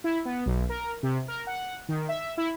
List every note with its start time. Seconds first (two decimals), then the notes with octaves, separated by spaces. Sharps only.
0.04 E4
0.25 B3
0.46 B1
0.69 A#4
1.03 C3
1.28 A#4
1.47 F#5
1.89 D#3
2.09 E5
2.37 E4